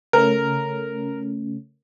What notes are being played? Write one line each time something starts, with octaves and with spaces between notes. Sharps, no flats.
C#3 A3 C#4 A#4